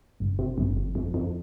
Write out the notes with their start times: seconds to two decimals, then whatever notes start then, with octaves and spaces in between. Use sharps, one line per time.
0.20 G1
0.39 C3
0.58 G1
0.76 F2
0.95 F2
1.14 F2